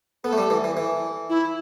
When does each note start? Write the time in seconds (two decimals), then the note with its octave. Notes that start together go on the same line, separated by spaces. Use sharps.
0.24 B3 A4
0.33 A3
0.38 G3
0.50 E3
0.64 E3
0.77 E3
1.29 E4